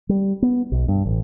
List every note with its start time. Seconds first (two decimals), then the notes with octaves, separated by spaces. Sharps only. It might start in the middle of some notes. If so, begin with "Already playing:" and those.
0.09 G3
0.42 B3
0.72 B1
0.88 G2
1.06 A1